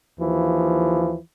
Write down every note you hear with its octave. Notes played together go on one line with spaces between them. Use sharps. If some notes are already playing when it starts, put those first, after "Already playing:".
D#2 E3 F3